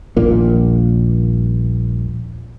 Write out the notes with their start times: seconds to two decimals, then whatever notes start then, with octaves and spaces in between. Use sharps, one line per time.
0.16 D#1 A#1 A#2 A#3